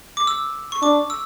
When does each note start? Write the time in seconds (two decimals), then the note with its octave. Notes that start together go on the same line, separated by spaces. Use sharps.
0.17 D6
0.27 E6
0.72 C#6
0.82 D4 D6
1.10 E6